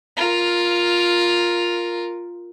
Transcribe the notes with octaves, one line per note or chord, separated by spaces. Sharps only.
F4 A#4